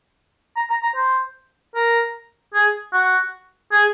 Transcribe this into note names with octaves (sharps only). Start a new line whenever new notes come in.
A#5
A#5
A#5
C5
A#4
G#4
F#4
G#4